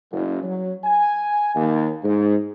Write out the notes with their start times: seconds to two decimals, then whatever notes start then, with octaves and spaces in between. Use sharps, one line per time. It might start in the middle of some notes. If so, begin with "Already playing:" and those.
0.11 F#1
0.43 F#3
0.84 G#5
1.54 D#2
2.03 G#2